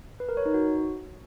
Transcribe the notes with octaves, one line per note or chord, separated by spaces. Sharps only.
B4
A#4
C#5
D#4
F#4